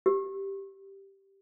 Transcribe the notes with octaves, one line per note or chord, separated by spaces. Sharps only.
G4